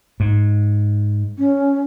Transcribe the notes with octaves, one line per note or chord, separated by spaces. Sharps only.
G#2
C#4